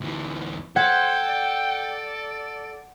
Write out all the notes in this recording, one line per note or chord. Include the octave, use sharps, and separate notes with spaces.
D2 E3
A4 C5 F#5 G5 G#6 B6
D5